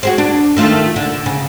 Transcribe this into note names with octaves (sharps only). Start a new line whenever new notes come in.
F#4 G#4 C5
D4
D#3 A3 F4
D3
C#3